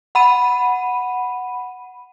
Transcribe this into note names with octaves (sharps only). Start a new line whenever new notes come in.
F#5 B5 D#7